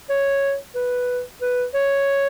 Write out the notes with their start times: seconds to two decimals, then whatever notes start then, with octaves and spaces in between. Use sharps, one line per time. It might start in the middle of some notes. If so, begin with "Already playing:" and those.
0.09 C#5
0.75 B4
1.41 B4
1.74 C#5